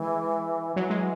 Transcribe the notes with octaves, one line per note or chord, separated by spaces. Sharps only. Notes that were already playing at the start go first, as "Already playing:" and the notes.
Already playing: E3 G#3
E3 F#3
G#3